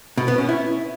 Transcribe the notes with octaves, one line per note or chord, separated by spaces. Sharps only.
B2
B3
C#4
E4